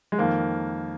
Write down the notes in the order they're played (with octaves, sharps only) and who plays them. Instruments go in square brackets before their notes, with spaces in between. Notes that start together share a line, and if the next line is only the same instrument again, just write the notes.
[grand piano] G#3
F2 D#3 A#3